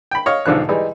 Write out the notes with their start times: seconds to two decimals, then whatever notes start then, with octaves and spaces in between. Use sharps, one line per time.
0.11 G5 B5
0.26 C#5 D#5 F5
0.46 B1 G#2 D3 F3 F#6
0.69 E3 G3 G#3 D#4